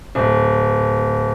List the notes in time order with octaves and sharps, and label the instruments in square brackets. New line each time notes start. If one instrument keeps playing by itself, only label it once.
[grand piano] D1